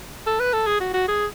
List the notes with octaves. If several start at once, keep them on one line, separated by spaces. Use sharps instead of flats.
A4
B4
A4
G#4
F#4
F#4
G#4